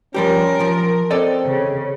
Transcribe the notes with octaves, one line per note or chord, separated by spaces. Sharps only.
F3 G3 C#4 G4 A#4
F3
C4 A4 D5 D#5
C#3